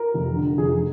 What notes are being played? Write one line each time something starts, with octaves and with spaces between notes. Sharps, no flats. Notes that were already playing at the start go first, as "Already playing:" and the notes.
Already playing: A#4
F1
D3
F1 G#4